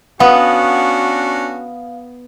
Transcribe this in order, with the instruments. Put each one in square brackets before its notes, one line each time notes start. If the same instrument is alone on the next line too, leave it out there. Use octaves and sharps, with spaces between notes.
[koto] B3 [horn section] C#4 D4 F#4 [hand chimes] F5 [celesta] F#5 D#6